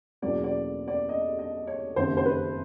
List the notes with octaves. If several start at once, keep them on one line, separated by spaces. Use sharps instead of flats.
E2 B2 F#3 A#3 C#4 D5
D5
D5
D#5
D#5
C#5
F#1 F2 C3 D#3 C5
C5
B4